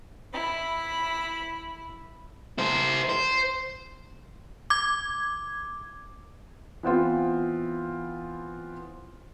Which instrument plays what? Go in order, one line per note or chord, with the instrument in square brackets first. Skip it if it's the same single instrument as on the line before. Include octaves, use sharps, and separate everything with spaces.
[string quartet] E4 B5
[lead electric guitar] E4 C5
C5
[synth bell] D6 G#6
[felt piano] E3 B3 C4 F4